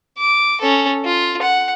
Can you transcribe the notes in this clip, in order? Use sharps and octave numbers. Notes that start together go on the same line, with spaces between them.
D6
C#4 A4
F4
F#5